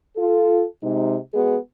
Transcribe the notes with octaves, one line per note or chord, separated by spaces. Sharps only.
F4 A4
C3 G#3 D#4
G#3 B3 F#4 G#4